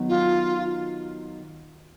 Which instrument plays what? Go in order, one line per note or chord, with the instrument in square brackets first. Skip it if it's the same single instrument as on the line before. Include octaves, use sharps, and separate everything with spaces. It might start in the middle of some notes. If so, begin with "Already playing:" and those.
Already playing: [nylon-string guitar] D#3 F#3 B3
[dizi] F4